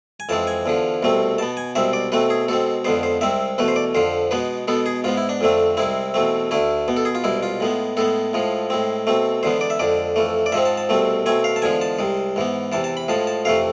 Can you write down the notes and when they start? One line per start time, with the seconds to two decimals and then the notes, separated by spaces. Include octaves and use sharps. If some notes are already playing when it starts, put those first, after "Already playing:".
0.20 G#5
0.29 F2 E3 G#3 C4 A5
0.47 G#5
0.66 E2 D3 F3
1.03 C2 B2 A3 C4
1.38 B2 B3 A5
1.57 G#5
1.75 C2 B2 G#3 C4 E5
1.93 D5
2.12 B2 A3 C4 B4
2.30 G#4
2.48 B2 G#3 C4 A4
2.85 F2 D3 G#3 B3 C5
3.03 C5
3.21 C2 C3 G#3 C4 E5
3.58 E2 B2 A3 B4
3.68 C5
3.76 D5
3.94 F2 D3 F3 C5
4.31 B2 G#3 B3 B4
4.68 B2 G#3 B3 A4
4.86 G#4
5.04 G#2 G#3 B3 F4
5.17 E4
5.29 D4
5.41 F2 D3 A3 C4
5.77 C2 C3 G#3 C4 E4
6.14 E2 B2 A3 C4
6.51 D2 D3 A3 E4
6.88 B2 B3
6.97 A4
7.05 G#4
7.15 F4
7.24 C2 B2 G#3 E4
7.43 F4
7.60 A2 G#3 B3
7.97 A2 G#3 B3 A4
8.33 A2 F3 G#3
8.70 A2 G#3 C4
9.07 B2 A3 C4
9.43 E2 D3 G#3 B3 C5
9.61 D5
9.70 E5
9.79 F2 D3 G#3 D5
10.16 F2 E3 A3
10.46 D5
10.52 G#2 F3 G#3 C4 E5
10.65 A5
10.78 A5
10.89 C2 B2 A3 C4
11.26 B2 A3 C4 G#5
11.44 F5
11.56 A5
11.62 E2 D3 F3 G#3 G#5
11.81 A5
11.99 C2 C3 G#3
12.36 G#2 E3 B3
12.72 E2 C3 E3 A5
12.84 A5
12.97 B5
13.08 A2 F3 G#3 A5
13.27 A5
13.45 F2 C3 E3 A3 F5